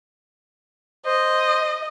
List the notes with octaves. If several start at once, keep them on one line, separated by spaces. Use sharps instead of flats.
C5 D#5